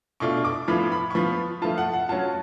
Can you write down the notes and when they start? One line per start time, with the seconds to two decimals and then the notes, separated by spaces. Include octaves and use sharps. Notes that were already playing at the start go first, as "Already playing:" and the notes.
0.20 B2 A3 D4 F4 C#6
0.45 D6
0.68 A2 F3 B3 F4 B5
0.92 B5
1.10 C#6
1.15 F3 B3 F4 B5
1.62 F3 A3 F4 A5
1.78 F#5
1.94 F#5
2.09 F#3 C#4 F4 A5